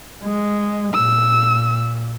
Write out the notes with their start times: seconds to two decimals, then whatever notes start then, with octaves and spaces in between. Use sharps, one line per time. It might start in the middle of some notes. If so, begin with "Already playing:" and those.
0.24 G#3
0.94 A#2 E6